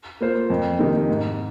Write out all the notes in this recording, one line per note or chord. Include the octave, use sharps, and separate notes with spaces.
A#3 F4 C5
F2
C3 D#3 A#3 D#4
G#2